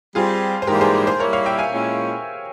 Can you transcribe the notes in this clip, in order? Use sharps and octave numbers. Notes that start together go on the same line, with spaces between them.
G3 C4 F4 G4 G#4
C5
G#2 E3 G3 A#3 G4 A#4
G#4 C5
G#4 C5
G3 A#3 E4 A#4 C#5
C#5 F5
E5 G5
F5 G#5
A#2 G#3 C#4 E4